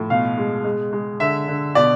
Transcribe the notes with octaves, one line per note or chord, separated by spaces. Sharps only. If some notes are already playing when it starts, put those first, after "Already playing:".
Already playing: A2 F3
B2 F5
G#3
G#3
G#3
D3 E5
D3
B2 D5